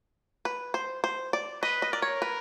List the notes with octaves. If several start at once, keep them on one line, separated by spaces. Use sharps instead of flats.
B4
C5
C5
D5
B4 D#5
D#5
A#4 D5
C#5
B4